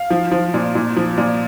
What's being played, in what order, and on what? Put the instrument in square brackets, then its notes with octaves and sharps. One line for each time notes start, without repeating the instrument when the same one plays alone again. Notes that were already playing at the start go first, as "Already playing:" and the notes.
Already playing: [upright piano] F5
F3
F3
A#2
A#2
F3
A#2